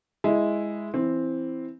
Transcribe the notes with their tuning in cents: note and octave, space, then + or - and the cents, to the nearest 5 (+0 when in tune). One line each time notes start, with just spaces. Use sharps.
G#3 +0 E4 +0
E3 +0 C4 +0